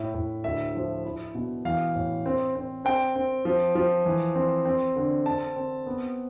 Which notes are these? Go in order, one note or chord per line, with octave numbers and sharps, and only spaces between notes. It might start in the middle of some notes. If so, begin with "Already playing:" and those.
Already playing: A2 E4
A2
D2 E5
F3
E4
B2
E3 F5
A2
C4
C4
C4 G5
C4
F3
F3
E3
C4
C4
D3
C4 A5
C4
B3